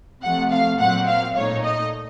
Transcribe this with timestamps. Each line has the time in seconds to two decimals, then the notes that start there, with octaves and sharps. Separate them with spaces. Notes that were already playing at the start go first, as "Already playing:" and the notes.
0.22 C3 F3 A3 F#5
0.51 F5
0.79 A#2 F#3 C4 F#5
1.07 F5
1.36 A#2 A3 D#4 C#5
1.63 D#5